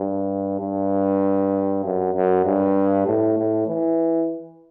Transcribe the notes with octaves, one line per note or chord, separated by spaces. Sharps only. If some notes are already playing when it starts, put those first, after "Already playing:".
Already playing: G2
G2
F#2
F#2
G2
A2
A2
E3